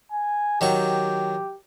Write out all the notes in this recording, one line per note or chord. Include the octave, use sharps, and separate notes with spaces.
G#5
D#3 F#3 G4 C#6